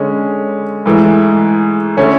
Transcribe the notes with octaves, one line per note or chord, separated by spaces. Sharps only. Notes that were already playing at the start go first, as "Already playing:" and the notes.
Already playing: D3 G#3 C#4
G#2 E3 A3
D3 A3 C#4